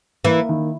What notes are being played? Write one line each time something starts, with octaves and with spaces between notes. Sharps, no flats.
E3 A#3
D#3